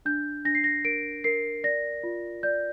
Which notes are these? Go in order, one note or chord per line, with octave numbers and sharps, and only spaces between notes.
D4 G6
D4 A#6
C7
A#6
A#4 D7
A#4 C7
D5 A#6
F4
D5 G6